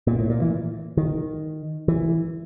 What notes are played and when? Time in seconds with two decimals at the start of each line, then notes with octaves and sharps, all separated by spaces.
0.07 A#2
0.19 A2
0.30 A#2
0.41 E3
0.97 D#3
1.88 E3